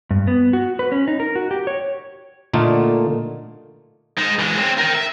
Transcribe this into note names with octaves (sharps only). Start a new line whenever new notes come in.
G2
B3
F#4
B4
C#4
D#4
A#4
F#4
G4
C#5
A#2 D3 A3 A#3 D#4 F4
G#3 D#4
E3 G#3
C4 C#5
A#4 G5
E5